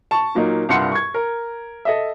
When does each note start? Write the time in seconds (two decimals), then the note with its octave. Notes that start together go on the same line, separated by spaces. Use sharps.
0.11 A5 C#6
0.35 A#2 F#3 A#3 D#4
0.69 C2 G2 F4 F#5 C6 C#7
0.92 C#6 G#6
1.14 A#4
1.85 A4 D#5 E5